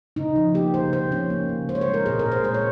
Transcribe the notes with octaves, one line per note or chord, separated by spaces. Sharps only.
C#3 D#4
F3
A#3 G4
C#3 C5
C#3 C5
F3 C#4
A#3
C#3
G#3 C5
C#5
C5
G#3
A#4
A#2 G#4
A#4
A#2
C5
G#3 C5
C#5